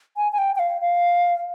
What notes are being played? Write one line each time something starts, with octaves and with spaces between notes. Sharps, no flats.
G#5
G#5
G5
G5
F5
F5